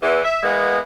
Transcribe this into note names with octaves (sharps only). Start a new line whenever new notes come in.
E2 E3
E5
E3 G#3 A#3 B3